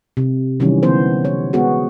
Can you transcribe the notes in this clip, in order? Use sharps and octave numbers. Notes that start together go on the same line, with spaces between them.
C3
C3 D#3 E3 F#3 G3 C#4
D3 E3 B3 C5
C#5
G#3 B3 F#4 G#4